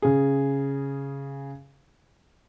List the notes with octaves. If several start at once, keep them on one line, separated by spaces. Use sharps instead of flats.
C#3 G#4